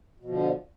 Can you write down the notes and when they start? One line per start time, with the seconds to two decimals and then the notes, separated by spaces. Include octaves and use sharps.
0.20 B2
0.25 F3
0.30 D3